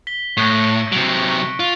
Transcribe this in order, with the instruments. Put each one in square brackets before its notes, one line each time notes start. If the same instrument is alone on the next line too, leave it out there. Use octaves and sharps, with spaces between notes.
[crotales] B6 G7
[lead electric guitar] A2 [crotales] C#6 F#6 A#6
[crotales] C#7 D7
[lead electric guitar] C3 F#3 [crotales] D7
[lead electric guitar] F4